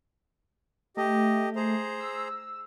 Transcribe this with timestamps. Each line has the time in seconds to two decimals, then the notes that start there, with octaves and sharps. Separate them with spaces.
0.97 A3 G4 D#5
1.56 G#4 C5 A#5
2.00 E6